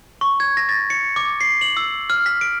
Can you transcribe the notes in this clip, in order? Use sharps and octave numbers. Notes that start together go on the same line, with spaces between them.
C#6
G#6
A#6
A6
C#7
D6
C7
F#7
E6
F6
B6
D7